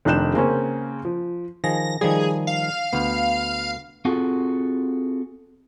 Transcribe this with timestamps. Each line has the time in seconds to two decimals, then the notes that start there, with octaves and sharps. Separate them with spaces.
0.05 F1 D#3 D4 F#6 G6 E7
0.34 C#3 A#3 C4 C#4
1.05 F3
1.64 D#3 F3 G#4 A#6
2.01 D#3 F3 G3 G#4
2.47 F5
2.93 D2 B3
4.05 C4 F4 F#4 G#4 A4